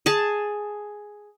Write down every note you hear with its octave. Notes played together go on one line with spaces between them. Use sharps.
G#4 A5